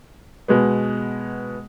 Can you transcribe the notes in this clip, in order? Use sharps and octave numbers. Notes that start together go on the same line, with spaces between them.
B2 G#3 B3